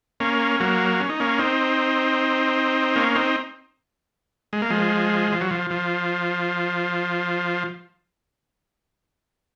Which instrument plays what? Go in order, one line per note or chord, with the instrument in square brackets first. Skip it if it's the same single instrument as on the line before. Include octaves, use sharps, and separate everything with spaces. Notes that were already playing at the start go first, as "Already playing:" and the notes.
[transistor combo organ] A#3 C#4
F#3 A#3
C#4
D#4
A#3 C#4
C4 D#4
A#3 C#4
C4 D#4
G#3
A#3
F3 G#3
F3
F#3
F3
F3